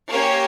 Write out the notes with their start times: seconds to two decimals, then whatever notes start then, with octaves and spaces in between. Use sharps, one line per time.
0.10 A#3 C#4 G4 C#5